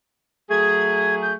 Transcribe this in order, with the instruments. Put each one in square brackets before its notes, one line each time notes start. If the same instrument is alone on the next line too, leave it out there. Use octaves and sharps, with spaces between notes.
[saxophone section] F#3 A3 G#4 [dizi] G#6
[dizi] G6